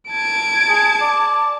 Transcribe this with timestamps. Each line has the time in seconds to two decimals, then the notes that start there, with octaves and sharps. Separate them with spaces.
0.11 A5 G#6 D7
0.69 G#4
1.01 D5